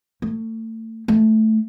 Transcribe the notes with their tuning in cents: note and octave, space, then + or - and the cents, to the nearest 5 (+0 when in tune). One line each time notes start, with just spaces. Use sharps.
A3 +30
A3 -5